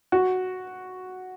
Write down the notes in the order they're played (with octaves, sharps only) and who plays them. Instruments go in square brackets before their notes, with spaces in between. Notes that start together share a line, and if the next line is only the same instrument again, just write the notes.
[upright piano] F#4